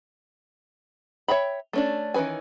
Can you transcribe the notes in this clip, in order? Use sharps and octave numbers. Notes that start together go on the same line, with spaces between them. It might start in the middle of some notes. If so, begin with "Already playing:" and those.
C#5 E5 G5 B5
A3 C#4 D4
D#3 E3 C#4 B4 G#5